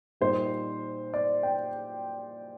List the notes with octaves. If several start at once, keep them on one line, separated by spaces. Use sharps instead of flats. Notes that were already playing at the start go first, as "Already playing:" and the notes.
A#2 G3 A#3 D#4 C5
D5
G5